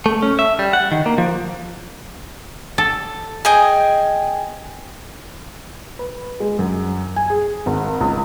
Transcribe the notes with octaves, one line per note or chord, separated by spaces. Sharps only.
A3
C#4
E5
G3
F#5
D#3
A#3
F3
A4
G#4 D#5 G5 G#5
B4
G#3
F#2
G#5
G#4
G#1
C#2